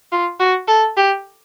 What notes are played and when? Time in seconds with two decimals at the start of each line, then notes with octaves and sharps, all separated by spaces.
0.12 F4
0.40 F#4
0.68 A4
0.97 G4